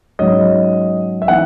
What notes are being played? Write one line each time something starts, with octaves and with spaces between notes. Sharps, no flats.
G#2 F#3 C#4 D#5
E5
E3 B3 D#4 F#5